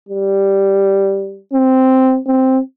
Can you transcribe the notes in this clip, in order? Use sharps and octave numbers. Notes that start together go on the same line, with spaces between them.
G3
C4
C4